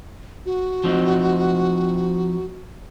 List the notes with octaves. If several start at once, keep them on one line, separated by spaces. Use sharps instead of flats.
F#4
F3 C4 D#4